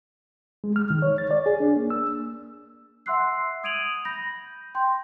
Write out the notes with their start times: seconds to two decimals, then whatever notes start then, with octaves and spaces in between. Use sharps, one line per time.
0.64 G#3
0.76 F6
0.90 D#3
1.02 C#5
1.18 A6
1.31 D5
1.46 G#4
1.60 D4
1.77 A#3
1.90 E6
3.06 E5 F#5 C6 E6 F#6 C7
3.64 D#6 G#6 D7 D#7 F7 F#7
4.05 B5 G6 A#6
4.75 G5 C6 G6